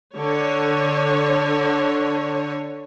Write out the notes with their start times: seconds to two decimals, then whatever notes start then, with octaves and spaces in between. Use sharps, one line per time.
0.17 D3 C#5